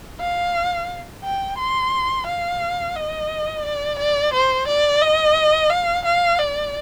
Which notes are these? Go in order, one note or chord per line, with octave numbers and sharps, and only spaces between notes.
F5
G5
C6
F5
D#5
D5
D5
C5
D5
D#5
F5
F5
D5